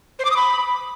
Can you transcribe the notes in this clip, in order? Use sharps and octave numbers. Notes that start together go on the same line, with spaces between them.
C5
D6
D#6
B5